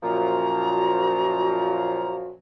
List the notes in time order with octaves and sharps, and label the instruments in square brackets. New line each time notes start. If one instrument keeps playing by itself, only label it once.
[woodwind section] F#2 A#2 F3 [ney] F#4 [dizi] A#5